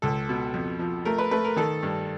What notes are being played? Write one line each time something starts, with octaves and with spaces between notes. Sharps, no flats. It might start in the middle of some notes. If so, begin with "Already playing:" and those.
C#2 A4
B2
F2
F3
A3 A#4
B4
A3 B4
A#4
D#3 A4
G2